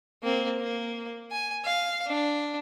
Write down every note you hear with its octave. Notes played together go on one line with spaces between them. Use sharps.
A#3 C4
A#3
G#5
F5
D4